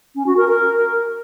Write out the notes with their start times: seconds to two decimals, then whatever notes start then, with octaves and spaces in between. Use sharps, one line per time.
0.15 C#4
0.26 F#4
0.37 A#4
0.47 A#4